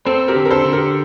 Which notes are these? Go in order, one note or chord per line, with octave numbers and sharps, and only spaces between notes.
C4 A4 C5
G4 A#4
D3
A#4
A4 C5
D3
G4 A#4